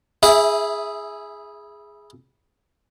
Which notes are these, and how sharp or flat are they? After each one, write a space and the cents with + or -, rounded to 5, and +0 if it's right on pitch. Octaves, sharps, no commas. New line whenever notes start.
E4 -20 G#4 +0 E5 +10